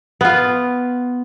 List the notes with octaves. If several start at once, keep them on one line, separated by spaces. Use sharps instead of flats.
B3 F4